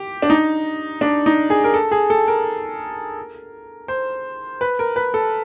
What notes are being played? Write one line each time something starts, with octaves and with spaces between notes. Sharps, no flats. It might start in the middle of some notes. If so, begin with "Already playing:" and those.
Already playing: G4
D4
D#4
D4
D#4
G#4
A#4
A4
G#4
A4
A#4
C5
B4
A#4
B4
A4